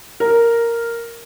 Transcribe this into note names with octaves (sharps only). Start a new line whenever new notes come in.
A#4